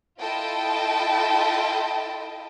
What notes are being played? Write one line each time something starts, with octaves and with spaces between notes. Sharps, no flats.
E4 F4 A4 D#5 G5 A5